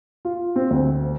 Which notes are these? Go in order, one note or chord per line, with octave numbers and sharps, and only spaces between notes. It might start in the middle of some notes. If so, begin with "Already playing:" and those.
F4
C4
D2